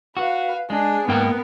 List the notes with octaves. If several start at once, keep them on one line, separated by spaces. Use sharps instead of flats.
F#4 B4 F5
G#3 D4 G#4
G#2 A#3 B3 A#4 G5